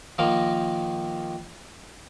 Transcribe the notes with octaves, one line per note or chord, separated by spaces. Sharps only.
D#3 F3 A#3 A#4 F5 A#5